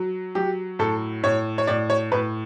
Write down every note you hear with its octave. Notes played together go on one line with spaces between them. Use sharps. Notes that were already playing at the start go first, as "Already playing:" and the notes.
Already playing: F#3
F#3 G4
A2 A4
A2 C#5
C#5
A2 D5
C#5
A2 B4